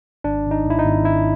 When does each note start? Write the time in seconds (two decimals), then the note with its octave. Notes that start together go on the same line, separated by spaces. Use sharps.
0.24 G#1 D4
0.45 G#1
0.51 D#4
0.66 G#2 E4
0.79 D#4
0.85 G#1
1.05 G#1 E4